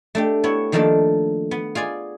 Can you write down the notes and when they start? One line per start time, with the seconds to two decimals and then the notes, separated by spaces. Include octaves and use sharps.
0.15 A3 D4 G4
0.44 B3 E4 C#5
0.72 D#3 F3 A3 A#3 D4 A4
1.51 B3
1.75 F4 G#4 D5 G#5